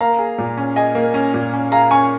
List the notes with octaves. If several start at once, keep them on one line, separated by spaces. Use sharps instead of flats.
A#3 F5 A#5
G#4
A#2
C#4
G#4 D#5 G#5
A#3
C#4
A#2
C#4
G#4 F5 A#5
C#4 G#5 C#6